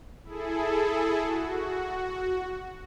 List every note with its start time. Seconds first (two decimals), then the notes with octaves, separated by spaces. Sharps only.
0.24 E4 G#4 A4
1.24 F#4